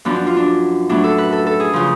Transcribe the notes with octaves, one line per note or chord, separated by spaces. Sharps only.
F#2 F3 B3 D4
D4
F4
D4
A2 F#3 B3 D4
A4
B4
A4
A4
G#4
C#3 F3